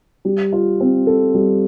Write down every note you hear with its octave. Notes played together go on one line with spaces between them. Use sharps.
G3
F4
C4
A4
G3